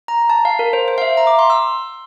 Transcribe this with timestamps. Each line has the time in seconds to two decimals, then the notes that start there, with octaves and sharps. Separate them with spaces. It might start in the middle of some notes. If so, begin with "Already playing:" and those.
0.08 A#5
0.30 A5
0.45 F5
0.59 A#4
0.73 C5
0.88 C5
0.98 F5
1.02 E5
1.17 A#5
1.27 D6
1.39 C6
1.50 E6